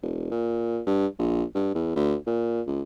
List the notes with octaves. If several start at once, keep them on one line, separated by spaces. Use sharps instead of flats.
E1
A#2
G2
A#1
G2
E2
D2
A#2
C#2